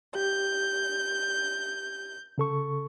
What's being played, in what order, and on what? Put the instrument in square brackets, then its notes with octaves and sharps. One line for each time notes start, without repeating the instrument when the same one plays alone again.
[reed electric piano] G4 [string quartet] G6
[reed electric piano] C#3 A4 C#6